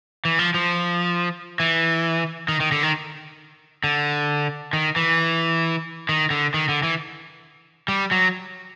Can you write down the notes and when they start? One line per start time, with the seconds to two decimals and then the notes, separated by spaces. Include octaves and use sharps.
0.25 E3
0.39 F3
0.54 F3
1.60 E3
2.48 D#3
2.60 D#3
2.72 D3
2.83 D#3
3.84 D3
4.73 D#3
4.96 E3
6.09 D#3
6.30 D3
6.54 D#3
6.69 D3
6.83 E3
7.88 G3
8.11 F#3